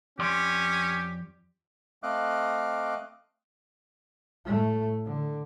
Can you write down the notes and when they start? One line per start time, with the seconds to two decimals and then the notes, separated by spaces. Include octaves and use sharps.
0.19 F2 C#4 G4 D5 C6
2.03 A3 C4 D#5 F5 D6 F#6
4.45 A2 A3
5.05 D3